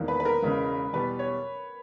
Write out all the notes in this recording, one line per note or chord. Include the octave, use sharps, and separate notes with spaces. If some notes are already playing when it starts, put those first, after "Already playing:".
Already playing: E1 E2 D#3 A#3
B4
B4
A#4
E1 E2 C#3 G#3
E2 B2 G3 B4
C#5